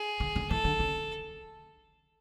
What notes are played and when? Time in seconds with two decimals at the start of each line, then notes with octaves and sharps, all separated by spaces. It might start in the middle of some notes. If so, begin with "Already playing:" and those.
Already playing: G#4
0.20 D3
0.36 D3
0.50 E3 A4
0.64 D3
0.79 C#3